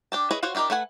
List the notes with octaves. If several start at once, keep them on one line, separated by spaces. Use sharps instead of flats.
D4 G4 A5
E4 G#4 B4 C#5 D#5
F4 F#4 C5 C#5 F#5
D4 E4 G4 A#4 D#5
A3 A4 B4 F#5 G#5